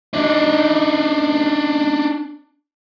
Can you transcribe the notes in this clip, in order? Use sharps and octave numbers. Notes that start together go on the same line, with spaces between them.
D4 D#4